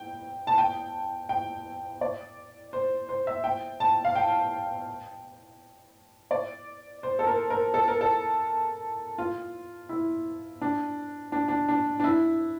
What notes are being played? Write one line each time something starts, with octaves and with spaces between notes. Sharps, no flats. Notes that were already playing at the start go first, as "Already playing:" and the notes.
Already playing: G5
A5
G5
G5
D5
C5
C5
E5
G5
A5
F5
G5
D5
C5
A4
A#4
A#4
A4
A#4
A4
F4
E4
D4
D4
D4
D4
D4
E4